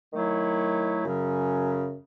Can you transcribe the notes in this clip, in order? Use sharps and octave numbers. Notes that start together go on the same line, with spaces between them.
D#3 F#3 A3 E4
F#2 C#3 F#3 C#4